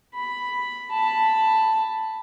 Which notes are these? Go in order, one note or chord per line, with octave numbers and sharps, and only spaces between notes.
B5
A5 B5